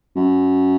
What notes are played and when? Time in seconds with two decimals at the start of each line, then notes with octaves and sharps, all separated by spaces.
0.16 F#2